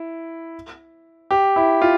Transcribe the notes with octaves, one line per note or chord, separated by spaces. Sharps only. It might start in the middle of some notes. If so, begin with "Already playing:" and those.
Already playing: E4
G4
E4
F4